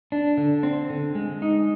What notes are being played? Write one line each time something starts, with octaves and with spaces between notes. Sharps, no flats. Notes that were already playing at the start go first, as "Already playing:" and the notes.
D4
D3
C4
D3
G#3
D#4